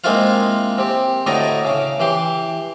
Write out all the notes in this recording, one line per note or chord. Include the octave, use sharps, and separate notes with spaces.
G#3 A#3 C4 E4 F4 F5
C4 G4
D2 A2 E4 D5 D#5 A#5
C#3 D6
E3 G4 C6 D6